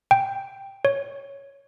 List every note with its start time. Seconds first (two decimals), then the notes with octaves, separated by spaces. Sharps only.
0.11 G5
0.85 C#5